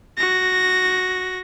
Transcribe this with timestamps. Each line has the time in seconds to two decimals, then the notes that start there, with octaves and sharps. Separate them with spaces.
0.18 F#4 A#6